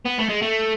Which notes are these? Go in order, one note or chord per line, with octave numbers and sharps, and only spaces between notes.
B3
A3
G#3
A3